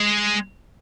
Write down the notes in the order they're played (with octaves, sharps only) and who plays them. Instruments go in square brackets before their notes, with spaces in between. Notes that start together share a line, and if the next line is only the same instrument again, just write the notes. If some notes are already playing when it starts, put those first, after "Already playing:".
Already playing: [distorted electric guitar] G#3